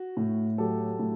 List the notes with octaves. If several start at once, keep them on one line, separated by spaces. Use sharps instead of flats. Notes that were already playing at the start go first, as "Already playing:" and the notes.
Already playing: F#4
A2
F#3 G4 A4
A2